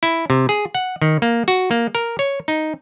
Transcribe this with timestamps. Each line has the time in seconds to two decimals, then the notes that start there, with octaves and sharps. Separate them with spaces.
0.03 E4
0.30 C3
0.49 G#4
0.75 F#5
1.02 D#3
1.22 A#3
1.48 F#4
1.71 A#3
1.95 A#4
2.19 C#5
2.48 D#4